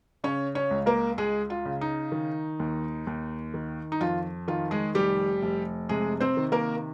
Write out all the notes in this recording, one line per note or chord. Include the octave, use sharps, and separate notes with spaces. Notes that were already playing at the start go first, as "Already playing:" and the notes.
C#3 C#4 C#5
C#4 C#5
C#2
A#3 A#4
C#2 G#3 G#4
F4
C#3
D#4
D#3
D#2
D#2
D#3
D#4
F2 F4
D#3 F4
G#3 G#4
F1 G3 G4
F1
C3 G#3 G#4
C4 C5
D#3
A#3 A#4